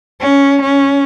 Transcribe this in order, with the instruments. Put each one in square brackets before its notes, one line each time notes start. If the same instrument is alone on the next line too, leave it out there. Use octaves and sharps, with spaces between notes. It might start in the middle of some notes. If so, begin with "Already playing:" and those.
[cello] C#4
C#4